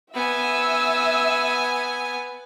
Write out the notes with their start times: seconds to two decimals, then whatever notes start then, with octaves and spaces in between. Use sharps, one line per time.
0.14 B3 E5 G#5 E6